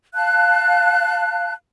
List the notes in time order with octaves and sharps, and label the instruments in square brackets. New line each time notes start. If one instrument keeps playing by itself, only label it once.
[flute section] F5 A5 F#6